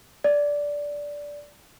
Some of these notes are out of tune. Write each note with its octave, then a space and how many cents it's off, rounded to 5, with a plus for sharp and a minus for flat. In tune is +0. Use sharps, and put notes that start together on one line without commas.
D5 -10